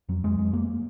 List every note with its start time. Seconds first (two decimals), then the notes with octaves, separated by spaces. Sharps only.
0.09 F2 F#3
0.24 F2 G#3
0.38 F2 G#3
0.53 F2 A#3